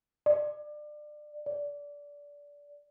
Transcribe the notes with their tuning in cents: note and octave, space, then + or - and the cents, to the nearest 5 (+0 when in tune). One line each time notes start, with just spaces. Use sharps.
D5 +25
D5 -20